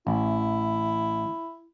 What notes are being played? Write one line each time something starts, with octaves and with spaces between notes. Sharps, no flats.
A1 E4